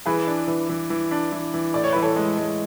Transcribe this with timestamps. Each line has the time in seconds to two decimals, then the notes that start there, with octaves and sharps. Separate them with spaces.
0.06 E3 G#4 B4
0.27 D4
0.48 E3
0.69 E3
0.90 E3
1.11 D4
1.32 E3
1.54 E3
1.74 A2 D5
1.84 C#5
1.93 E3 B4
2.02 A4 C#5
2.16 G#3
2.38 G#3